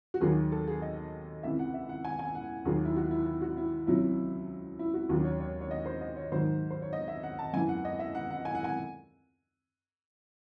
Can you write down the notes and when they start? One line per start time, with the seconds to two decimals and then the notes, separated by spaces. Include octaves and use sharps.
0.14 F#4
0.21 D#2 D#3 F#3 G#4
0.52 A4
0.67 G#4
0.82 D#5
1.43 C#2 C3 E3 E5
1.59 F#5
1.74 E5
1.89 F#5
2.05 G#5
2.19 G#5
2.35 F#5
2.65 D#2 D#3 F#3 G#4
2.85 E4
2.96 F#4
3.11 E4
3.26 E4
3.42 F#4
3.57 E4
3.87 C#2 C3 F#3 E4
4.79 E4
4.94 F#4
5.09 D#2 C#3 F#3 F#4
5.25 C#5
5.40 C#5
5.61 C#5
5.71 D#5
5.86 C5
6.01 D#5
6.16 C#5
6.32 G#2 D#3 F#3 C5
6.71 C5
6.82 C#5
6.93 D#5
7.08 E5
7.23 F#5
7.39 A5
7.53 F#2 E3 G#5
7.69 F#5
7.85 D#5
7.99 E5
8.15 F#5
8.30 F#5
8.45 G#5
8.55 F#5
8.64 G#5